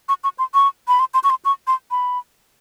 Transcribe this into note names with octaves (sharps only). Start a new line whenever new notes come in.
C#6
C#6
C6
C#6
B5
C6
C6
C#6
C6
C#6
C6
B5